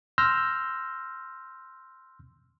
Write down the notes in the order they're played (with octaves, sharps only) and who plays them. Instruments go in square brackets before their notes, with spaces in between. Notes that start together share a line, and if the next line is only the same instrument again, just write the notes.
[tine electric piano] C6 E6 F6 G6 A#6